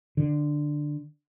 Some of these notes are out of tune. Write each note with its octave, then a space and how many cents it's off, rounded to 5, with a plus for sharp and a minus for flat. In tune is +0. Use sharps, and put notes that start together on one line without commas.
D3 +10